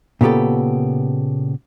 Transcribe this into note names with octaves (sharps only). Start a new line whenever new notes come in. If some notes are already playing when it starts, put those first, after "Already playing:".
A#2 C#3 B3 G4 A4